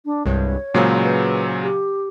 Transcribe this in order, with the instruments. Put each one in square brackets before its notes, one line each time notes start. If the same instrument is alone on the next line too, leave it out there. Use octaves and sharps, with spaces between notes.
[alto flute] D4
[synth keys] C2 G2 G#3 [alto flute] C#5
[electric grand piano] A#2 C#3 F#3 [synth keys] G#3 C5
[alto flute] B4
G4